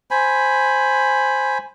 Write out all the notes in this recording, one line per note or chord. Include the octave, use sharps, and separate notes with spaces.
C5 G#5 B5